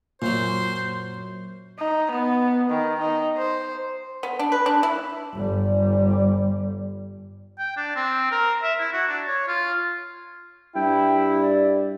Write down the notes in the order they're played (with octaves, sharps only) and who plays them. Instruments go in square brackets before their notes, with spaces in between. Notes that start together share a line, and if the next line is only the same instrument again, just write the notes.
[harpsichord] F#2 F#3 [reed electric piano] A#2 [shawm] C5
[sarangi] D#4
B3
D#3
D#4
C5
[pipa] B3
D4
B4
D4
E4
[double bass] G1 G3
[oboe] G5
D4
C4
A#4
E5
E4
F#4
D4
C#5
F4
[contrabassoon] G2 [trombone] E4 [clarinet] G5
[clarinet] D5